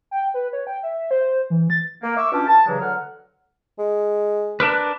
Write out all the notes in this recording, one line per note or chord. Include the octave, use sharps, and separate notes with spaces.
G5
B4
C#5
G5
E5
C5
E3
A6
A#3
E5 C#6 D6 E6
B2 C#4 D4 F4 G4
A5
G2 C#3 E3 F#3 G#3
D2 D3 F#3 F#5 F6
G#3
D4 A#4 B4